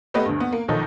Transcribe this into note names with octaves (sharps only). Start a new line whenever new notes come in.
A3 B3 G4 B4 D#5
D2 G2
B3
A#3
B1 D#3 F3 D#4 A4